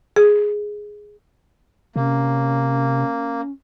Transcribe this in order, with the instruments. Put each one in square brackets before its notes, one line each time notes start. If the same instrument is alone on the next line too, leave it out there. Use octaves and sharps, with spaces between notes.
[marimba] G#4
[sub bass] C3 [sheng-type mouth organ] A#3 [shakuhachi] C#4